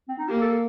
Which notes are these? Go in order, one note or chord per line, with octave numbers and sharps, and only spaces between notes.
C4
D#4
A#3 G4
A4